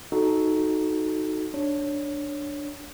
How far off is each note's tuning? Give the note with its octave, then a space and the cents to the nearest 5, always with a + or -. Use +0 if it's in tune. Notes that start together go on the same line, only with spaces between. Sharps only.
D#4 +5 F#4 +0 A4 -10
D4 +0 C#5 +0